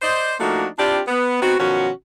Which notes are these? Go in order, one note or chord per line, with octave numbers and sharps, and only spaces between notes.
C5 D5 D#5
F3 A3 A#3 D4 D#4 F#4
C4 D4 E4 F4 G4 D5
B3
B3 C4 D#4 F#4
B2 D#3 F3 C#4 F#4